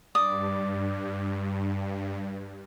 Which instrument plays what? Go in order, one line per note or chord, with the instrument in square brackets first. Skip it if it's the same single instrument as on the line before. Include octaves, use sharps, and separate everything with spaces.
[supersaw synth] G2 [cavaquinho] D5 D#6